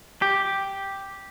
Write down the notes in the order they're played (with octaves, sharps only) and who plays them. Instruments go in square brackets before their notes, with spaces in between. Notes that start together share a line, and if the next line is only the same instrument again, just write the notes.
[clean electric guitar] G4